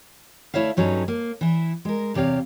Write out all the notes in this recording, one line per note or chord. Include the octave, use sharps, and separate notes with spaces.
D2 A3 E4 C#5 E5 F5
G2 F#3 C#4 D#4 A4 B4
A#3
E3 E4
G#3 A#4
E2 C3 G4 C#5 F5